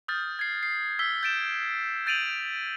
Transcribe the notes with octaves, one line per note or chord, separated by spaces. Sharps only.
D#6 F6 G6 A6
G#6 C7
C7
E6 B6 G7
G6 A6 D7 E7 G7
G6 A6 D7 D#7 F7 F#7